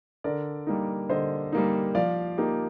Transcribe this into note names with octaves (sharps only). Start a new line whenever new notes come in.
D3 A#4 D5
G3 A#3 D#4
D3 C5 D#5
G3 A#3 D#4
F3 D5 F5
A#3 D#4 G4